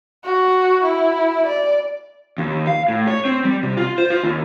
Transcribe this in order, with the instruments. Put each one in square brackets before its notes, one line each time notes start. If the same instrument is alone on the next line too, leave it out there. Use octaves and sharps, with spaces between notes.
[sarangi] F#4
E4
D5
[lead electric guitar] D#2
F5
A2
C#5
C4
G3
C3
F4
C5
F4
D#2